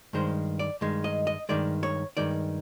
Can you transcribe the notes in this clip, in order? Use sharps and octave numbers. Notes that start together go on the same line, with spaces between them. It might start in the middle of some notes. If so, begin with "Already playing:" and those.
G2 D#3 G#3 C5
D5
G2 D#3 G#3
D#5
D#5
G2 D#3 G#3 D5
C#5
G2 D#3 G#3 D5